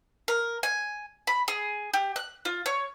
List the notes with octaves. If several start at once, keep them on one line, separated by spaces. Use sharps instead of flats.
A#4
G#5
B5
G#4
G4
F#6
F4
C#5